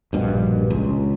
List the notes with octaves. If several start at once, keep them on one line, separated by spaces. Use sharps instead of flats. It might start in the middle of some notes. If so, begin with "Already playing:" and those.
A#1 G2 B2
C#2